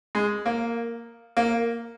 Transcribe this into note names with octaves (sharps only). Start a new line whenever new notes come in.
G#3
A#3
A#3